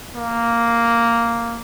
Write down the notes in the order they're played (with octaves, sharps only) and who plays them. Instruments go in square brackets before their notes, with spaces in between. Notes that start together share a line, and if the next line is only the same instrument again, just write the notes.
[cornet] A#3